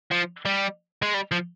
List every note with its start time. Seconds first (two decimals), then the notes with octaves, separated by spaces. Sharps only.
0.11 F3
0.45 G3
1.02 G#3
1.14 G3
1.32 F3